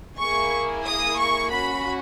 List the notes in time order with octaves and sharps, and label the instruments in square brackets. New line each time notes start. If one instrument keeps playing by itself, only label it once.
[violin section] A#3 E4 G#4 C#6
D#6
C#6
C#4 F#4 B5